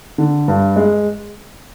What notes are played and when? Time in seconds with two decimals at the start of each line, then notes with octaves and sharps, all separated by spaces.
0.18 D3
0.48 G2
0.76 G#3